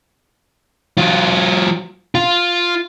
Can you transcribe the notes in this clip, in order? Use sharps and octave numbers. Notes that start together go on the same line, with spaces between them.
F#3 F4
F4